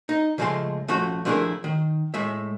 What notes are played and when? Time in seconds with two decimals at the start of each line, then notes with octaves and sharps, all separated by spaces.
0.09 D#4
0.38 C#3 F3 G#3 A3 G#5 C6
0.88 F3 A3 C#4 F#4
1.25 F3 A3 D4 E4 G#4 A#4
1.64 D#3
2.14 A2 G#3 E5